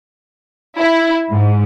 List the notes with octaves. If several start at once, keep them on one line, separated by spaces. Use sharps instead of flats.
E4
G#2